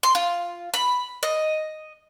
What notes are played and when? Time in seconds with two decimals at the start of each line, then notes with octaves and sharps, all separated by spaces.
0.03 C6
0.15 F4
0.74 B5
1.23 D#5